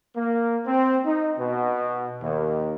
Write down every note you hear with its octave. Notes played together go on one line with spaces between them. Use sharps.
A#3
C4
D#4
B2
D#2